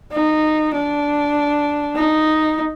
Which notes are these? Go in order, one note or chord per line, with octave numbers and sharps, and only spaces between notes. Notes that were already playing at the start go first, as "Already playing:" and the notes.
D#4
D4
D#4